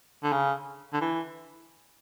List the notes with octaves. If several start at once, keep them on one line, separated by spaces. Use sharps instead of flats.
D3
C#3
D3
E3